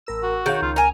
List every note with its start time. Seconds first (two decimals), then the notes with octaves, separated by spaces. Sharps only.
0.07 A1 A#4 E6
0.23 F#4
0.46 D#3 G#4 C#5 F5
0.62 C#2 F4
0.76 A#4 G#5 A#5